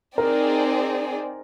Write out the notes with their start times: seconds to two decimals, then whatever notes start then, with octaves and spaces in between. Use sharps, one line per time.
0.18 C4 D#4 G#4 A#4 D5